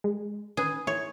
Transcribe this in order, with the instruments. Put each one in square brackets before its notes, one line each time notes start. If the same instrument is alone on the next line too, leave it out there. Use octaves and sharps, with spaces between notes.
[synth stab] G#3
[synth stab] D#3 C#4 B4 [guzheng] G#4
[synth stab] E4 [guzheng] C#5